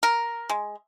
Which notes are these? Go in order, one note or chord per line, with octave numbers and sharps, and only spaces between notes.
A#4
G#3